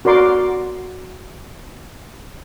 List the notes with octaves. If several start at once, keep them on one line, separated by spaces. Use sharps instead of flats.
F#4 A#4 D5 C6 D6